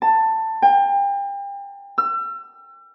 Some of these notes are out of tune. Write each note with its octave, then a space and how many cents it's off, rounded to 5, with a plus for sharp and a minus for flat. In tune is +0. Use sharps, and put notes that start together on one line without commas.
A5 +15
G5 +35
E6 +40